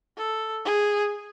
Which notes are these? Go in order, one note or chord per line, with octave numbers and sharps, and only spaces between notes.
A4
G#4